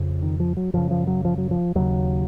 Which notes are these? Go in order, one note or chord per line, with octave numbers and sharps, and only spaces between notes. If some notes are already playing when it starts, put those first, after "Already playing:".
Already playing: F2 C#3
D#3
F3
F#3
F#2 C#3 F3
F3
F#3
F3
F#3
F3
D#2 C#3 F#3